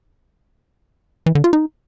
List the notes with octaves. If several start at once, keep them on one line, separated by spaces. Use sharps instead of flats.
E3
D3
F4
D#4